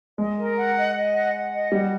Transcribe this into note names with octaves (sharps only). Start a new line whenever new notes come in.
G#3 D#5
A#4
F#5
D#5
D#5
F#5
F#5
D#5
G3 F#5